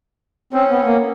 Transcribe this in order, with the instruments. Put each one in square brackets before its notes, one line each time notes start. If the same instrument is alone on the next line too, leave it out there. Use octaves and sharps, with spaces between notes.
[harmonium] C4 [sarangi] C#4
[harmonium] B3
A#3